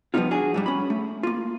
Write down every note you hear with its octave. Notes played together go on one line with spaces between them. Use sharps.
F3 G3 B3 C4 D#4 F4
D4 F#4 G#4
G#2 F#3 G3
C#4 B5
A3
A#3 F4